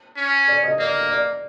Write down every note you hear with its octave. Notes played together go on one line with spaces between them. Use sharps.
C#4
D5
D#5
A#3 D5
D5